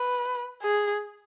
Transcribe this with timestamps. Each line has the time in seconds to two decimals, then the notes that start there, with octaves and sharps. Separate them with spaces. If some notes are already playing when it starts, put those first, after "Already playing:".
Already playing: B4
0.62 G#4